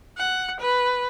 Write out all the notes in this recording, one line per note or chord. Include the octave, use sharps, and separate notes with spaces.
F#5
B4